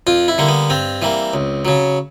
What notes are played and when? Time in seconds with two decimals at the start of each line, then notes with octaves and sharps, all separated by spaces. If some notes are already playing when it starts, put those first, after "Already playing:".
0.07 F2 F4
0.28 E4
0.38 D3 G3 A#3
0.48 B3
0.70 G2 C4
1.02 E3 G3 A#3
1.34 C#2
1.65 C#3 F#3